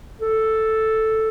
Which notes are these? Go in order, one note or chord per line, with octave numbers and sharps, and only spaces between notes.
A4